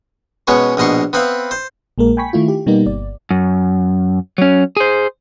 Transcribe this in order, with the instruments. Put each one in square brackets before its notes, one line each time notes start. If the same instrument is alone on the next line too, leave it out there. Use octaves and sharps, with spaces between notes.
[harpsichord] B2 G#3 B3 C#4 C#5 C#6
A#1 B2 D#5 C6 C#6
B3 C4 B4 E5 F5
C5
[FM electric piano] A#1 G#3 A#3 A#4
G5 G#5 B5 C#6 B6
D#3 A3 E4 F4
G4
B2 G3 A#3 B3 D#4 G4
G1 D5
[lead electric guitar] F#2
F#3 C#4
G#4 C5